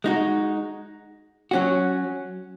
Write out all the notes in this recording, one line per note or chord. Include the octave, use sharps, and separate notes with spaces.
G#3 D#4 F#4
F#3 C#4 F#4